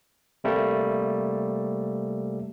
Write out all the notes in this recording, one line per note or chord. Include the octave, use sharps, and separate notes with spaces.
C3 G3 A3 A#3